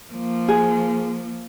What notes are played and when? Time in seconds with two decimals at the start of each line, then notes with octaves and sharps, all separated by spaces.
0.12 F3 A#3
0.48 G#4